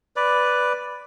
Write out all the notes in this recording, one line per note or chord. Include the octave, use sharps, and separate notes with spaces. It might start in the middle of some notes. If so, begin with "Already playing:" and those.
B4 D5